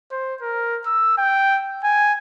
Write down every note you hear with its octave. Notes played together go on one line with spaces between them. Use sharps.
C5
A#4
E6
G5
G#5